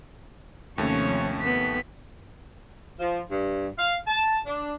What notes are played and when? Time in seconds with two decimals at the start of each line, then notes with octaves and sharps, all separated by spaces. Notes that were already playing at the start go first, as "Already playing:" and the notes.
0.78 D#2 C3 F3 A3 C#4 C#5
1.40 B3 B6
2.99 F3
3.31 G2
3.77 F5
4.07 A5
4.45 D4